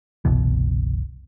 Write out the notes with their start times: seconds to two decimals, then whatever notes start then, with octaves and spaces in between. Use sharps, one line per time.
0.25 F#1 C2 B2 E3